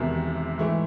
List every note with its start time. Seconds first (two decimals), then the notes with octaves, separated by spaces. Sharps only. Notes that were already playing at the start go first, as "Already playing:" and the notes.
Already playing: E1 E2 C3 D#3
0.58 G#2 E3 A3